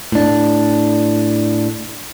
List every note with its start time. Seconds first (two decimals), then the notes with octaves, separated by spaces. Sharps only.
0.12 A2 D4